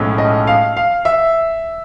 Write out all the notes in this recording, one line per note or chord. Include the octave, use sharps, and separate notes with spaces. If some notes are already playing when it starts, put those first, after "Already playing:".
Already playing: B1 A2 F3 G#3 C#4
D#5
F5
F5
E5